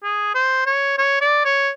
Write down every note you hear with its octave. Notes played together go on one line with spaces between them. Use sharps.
G#4
C5
C#5
C#5
D5
C#5